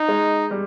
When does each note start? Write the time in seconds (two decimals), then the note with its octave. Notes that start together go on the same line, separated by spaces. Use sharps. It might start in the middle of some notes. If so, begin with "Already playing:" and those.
Already playing: D#4
0.08 G#3
0.51 G3